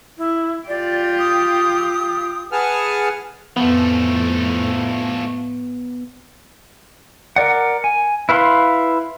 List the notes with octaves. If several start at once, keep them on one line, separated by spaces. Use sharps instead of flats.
E4
F4 G4 D5
D#6
G#4 B4 F#5 G#5 A5 F6
F2 A2 F3 A3 B3
A#4 D5 F#5
G#5
E4 B4 F5 B5 C6